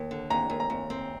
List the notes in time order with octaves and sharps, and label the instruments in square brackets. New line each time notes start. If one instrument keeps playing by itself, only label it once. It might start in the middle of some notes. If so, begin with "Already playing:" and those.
Already playing: [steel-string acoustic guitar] D#2
D3
[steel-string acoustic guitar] D#2 [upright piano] A#5
[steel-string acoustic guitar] D#2
[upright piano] A#5
[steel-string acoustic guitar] D#2
C4